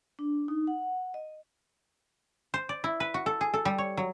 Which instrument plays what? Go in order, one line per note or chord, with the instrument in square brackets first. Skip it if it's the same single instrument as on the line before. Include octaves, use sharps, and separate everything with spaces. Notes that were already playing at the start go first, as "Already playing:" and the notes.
[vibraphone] D4
D#4
F#5
D#5
[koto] C5
D5
E4
B4
F#4
A4
G#4
A4
G3
C#5
F#3